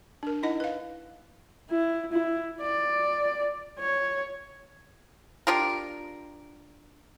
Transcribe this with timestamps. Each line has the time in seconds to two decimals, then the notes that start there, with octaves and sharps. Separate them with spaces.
0.23 D4 A#4
0.43 D#4 E4 D#5 F#5
0.60 B4 F5
1.70 E4
2.12 E4
2.61 D5
3.79 C#5
5.47 D4 F4 G4 A#4